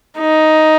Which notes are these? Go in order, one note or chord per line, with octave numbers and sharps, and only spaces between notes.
D#4